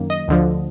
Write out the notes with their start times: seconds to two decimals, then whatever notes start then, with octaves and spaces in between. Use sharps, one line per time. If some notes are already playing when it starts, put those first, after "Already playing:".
Already playing: F#2 D#3 A#3
0.10 D#5
0.28 D2 D3 F3